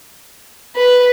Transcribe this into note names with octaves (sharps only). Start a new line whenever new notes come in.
B4